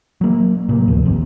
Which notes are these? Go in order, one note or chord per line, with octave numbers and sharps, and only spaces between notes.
F#3 A#3
A2 C3 A#3
D2 A2 F3
G#1 D#2 C4